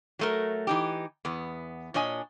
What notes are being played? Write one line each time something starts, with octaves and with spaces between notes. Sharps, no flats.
F#3 A3 A#4
E3 D#4 G4
E2 B3
A#2 D4 C#5 D#5 G#5